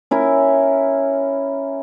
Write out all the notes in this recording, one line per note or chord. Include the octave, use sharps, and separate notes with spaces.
C#4 E4 A#4